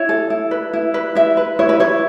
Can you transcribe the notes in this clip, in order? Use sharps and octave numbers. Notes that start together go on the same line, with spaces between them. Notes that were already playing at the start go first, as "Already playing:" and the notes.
Already playing: E4 C#5
A4
E4
B4
E4
B4
E4 E5
B4
E4 C#5
B4
E4 C#5